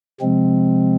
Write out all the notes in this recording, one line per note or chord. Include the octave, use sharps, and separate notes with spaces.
C3 F3 G#3 C4